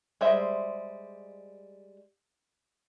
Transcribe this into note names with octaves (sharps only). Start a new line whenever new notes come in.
G3 G#3 C5 E5